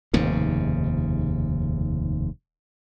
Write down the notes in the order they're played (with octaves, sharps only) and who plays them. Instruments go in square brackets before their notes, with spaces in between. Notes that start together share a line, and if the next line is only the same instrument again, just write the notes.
[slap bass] F1 D#2 G#2 C#3